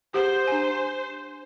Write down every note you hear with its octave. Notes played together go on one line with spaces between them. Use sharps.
G4 G#4 C5 F#5
D4 G#5